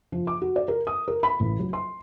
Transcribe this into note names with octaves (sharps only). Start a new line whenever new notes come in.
F3
D6
F#4
D5
A#4
D#6
A#4
B5
A1
F#3
C6